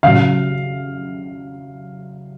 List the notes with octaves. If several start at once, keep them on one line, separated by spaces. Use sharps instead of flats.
C#3 F#3 F5